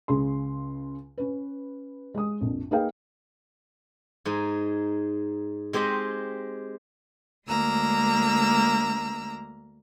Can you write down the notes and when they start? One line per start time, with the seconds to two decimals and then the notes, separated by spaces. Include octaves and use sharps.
0.08 C#2 C#3 G#4 C6
1.18 C#4 B4
2.14 G#3 D#6
2.41 A#1 F2
2.71 A#3 D#4 G#4 B4 F5 G5
4.25 G#2 D#4 G#4
5.73 G#3 C4 G4 C5 D#5
7.48 D2 G#3 A#3 A#5 E6